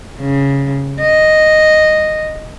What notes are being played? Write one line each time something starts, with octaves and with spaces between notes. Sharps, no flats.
C#3
D#5